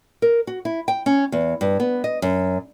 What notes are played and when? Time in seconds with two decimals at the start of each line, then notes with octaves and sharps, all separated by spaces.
0.22 A#4
0.47 F#4
0.65 E4
0.88 G5
1.06 C#4
1.32 E2
1.61 G2
1.80 B3
2.04 D#5
2.22 F#2